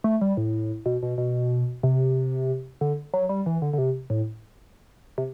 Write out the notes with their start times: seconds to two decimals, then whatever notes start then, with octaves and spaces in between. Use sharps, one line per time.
0.04 A3
0.21 G3
0.37 A2
0.86 B2
1.03 B2
1.18 B2
1.83 C3
2.81 D3
3.14 F#3
3.29 G3
3.46 E3
3.62 D3
3.73 D3
3.78 C3
4.10 A2
5.18 C3